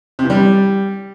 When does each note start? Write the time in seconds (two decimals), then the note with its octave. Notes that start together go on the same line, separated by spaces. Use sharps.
0.19 C3
0.24 E3
0.30 G3